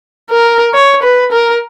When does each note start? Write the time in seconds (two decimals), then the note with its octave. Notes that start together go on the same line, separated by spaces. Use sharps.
0.31 A#4
0.74 C#5
1.03 B4
1.32 A#4